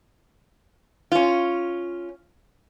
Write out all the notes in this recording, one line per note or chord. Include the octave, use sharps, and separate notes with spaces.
C#4 F4